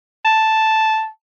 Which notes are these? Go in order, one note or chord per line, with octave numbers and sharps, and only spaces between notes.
A5